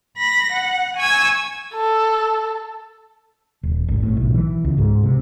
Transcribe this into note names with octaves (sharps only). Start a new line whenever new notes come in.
B5 A#6
F#5
G#5 C#6 E6 G#6
A4
D#1
G#1
A2
B1
E3
C#2
G#2
C3